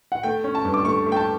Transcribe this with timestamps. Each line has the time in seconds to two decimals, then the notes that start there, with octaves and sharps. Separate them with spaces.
0.12 F#5
0.23 A3 G5
0.44 C#4
0.55 A5
0.65 G2
0.74 D6
0.85 A3 C#6
1.06 A3
1.12 G5
1.16 A5